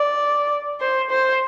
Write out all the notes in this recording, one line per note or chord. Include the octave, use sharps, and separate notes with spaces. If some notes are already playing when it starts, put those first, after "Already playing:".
Already playing: D5
C5
C5